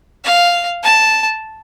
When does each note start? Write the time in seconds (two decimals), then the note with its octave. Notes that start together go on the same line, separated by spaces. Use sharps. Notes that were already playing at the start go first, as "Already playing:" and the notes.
0.24 F5
0.83 A5